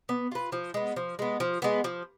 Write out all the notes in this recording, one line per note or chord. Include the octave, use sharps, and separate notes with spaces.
B3
F4 B4
F3
G#3 B3
F3
G#3 B3
F3
G#3 B3
F3